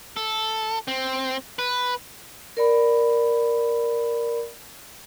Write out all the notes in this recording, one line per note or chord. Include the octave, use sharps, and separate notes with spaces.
A4
C4
B4
A#4 D5 B5